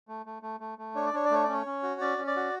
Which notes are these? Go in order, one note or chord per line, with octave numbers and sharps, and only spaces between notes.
A3
A3
A3
A3
A3
D4 C#5
D5
D4 C#5
D5
A3 C#5
C#4 D5
C#5
C#4
F#4
C#4 D5
C#4
D5
F#4